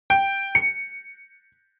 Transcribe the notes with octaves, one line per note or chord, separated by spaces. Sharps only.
G5
C#7